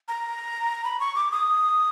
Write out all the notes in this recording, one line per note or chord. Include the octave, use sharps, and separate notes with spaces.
A#5
B5
C#6
D6
D#6